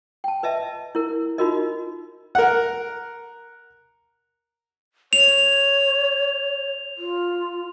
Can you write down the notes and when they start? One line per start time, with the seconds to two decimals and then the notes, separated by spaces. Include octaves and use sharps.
0.24 G5 A5
0.43 B4 D#5 E5 A5
0.95 E4 A#4
1.38 D#4 F4 F#4 A#4 D#5
2.35 A#4 F#5
5.13 C#5 F7
6.98 F4